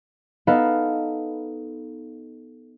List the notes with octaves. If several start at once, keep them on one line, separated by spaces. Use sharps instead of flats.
B3 D#4 A4 B4 F5